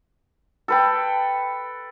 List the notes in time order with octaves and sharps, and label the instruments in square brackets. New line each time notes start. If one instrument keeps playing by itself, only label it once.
[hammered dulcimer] A4 B4 G5